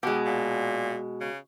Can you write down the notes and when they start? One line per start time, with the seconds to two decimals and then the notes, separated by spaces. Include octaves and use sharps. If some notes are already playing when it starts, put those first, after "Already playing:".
0.03 B2 G#3 G4
0.25 A#2
1.20 C#3